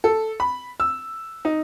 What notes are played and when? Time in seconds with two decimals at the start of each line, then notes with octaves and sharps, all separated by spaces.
0.04 A4
0.40 B5
0.80 E6
1.45 D#4